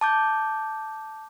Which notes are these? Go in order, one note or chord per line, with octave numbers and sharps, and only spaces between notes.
A5 D6 G6